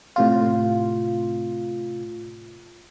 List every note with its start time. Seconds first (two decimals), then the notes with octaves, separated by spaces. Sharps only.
0.16 A2 C3 F4